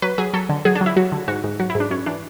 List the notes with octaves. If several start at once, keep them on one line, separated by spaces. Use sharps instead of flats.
F#3 B4
F#3 G#4
F#3 A4
D3
F#3 G#4
D4
F#3
E4
F#3 F#4
D3
G#2 F#4
G#2
F#3 F#4
E4
G#2
D4
F#2 C#4
E3 D4